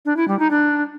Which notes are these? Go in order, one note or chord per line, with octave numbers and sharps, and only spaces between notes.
D4
E4
G3
D#4
D4